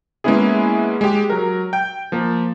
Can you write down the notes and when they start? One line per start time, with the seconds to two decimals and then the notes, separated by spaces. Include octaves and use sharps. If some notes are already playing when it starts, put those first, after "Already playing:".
0.24 G#3 A#3 B3 C#4 E4 G#4
1.01 G#3 G4
1.30 F#3 A#4
1.73 G5 G6
2.12 F3 A#3